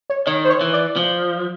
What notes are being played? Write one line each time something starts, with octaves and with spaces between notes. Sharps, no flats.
C#5
D#3 C#5
C5
C#5
E3
D5
F3